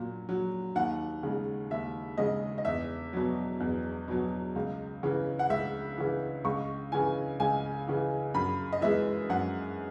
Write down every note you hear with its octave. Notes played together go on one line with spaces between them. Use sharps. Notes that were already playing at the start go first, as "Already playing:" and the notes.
Already playing: A#2 F#3
F#3
D#2 F#5
C#3 G#3
D#2 E5
C#3 G#3 D#5
D#5
E2 E5
B2 F#3
E2
B2 F#3
C#2
C#3 E3
F#5
C#2 E5
C#3 E3
C#2 C#6
C#3 E3 G#5
C#2 G#5
C#3 E3
F#2 B5
D#5
E3 G#3 E5
F#2 F#5